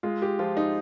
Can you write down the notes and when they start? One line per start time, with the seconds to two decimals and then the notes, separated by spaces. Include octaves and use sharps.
0.03 G#3 F4
0.22 G4
0.39 F3 F4
0.57 D#4